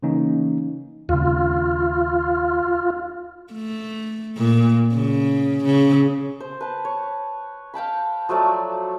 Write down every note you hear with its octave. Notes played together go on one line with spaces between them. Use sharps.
C#3 E3 A#3 C#4 D#4
D#2 C#3 F4
A3
A#2
C#3
C#3
C5
B4 A5
C#5
F5 G5 A5 B5
F3 F#3 A3 D5